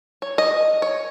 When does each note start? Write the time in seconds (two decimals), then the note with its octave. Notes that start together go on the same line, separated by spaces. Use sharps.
0.22 C#5
0.38 D#5
0.82 C#5